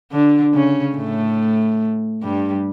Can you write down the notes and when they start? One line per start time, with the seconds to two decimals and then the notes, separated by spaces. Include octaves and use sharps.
0.12 D3 D4
0.54 C#3 C#4
0.96 A2 A3
2.23 G2 G3